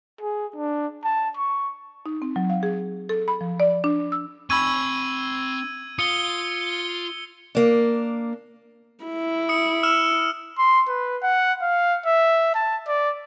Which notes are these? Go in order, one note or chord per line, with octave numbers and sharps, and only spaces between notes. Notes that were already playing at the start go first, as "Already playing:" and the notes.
G#4
D4
A5
C#6
D#4
C4
F#3
F5
G#4
A4
B5
F3
D5
D4
E6
C4 G#5 B5 C#6 E6 G#6 D#7
F4 D#6 C#7 G7
A#3 D4
E4
D#6 C#7
E6 F6 E7
C6
B4
F#5
F5
E5
A5
D5